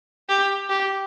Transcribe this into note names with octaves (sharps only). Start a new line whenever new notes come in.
G4
G4